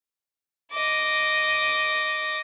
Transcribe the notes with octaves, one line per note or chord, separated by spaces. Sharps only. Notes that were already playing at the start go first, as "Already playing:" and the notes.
D#5 D6